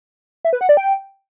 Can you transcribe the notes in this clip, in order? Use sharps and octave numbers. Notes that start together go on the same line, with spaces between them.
E5
B4
F#5
D5
G5